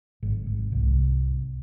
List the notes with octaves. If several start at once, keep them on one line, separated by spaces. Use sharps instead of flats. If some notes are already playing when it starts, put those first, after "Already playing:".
G#1
G#1
C2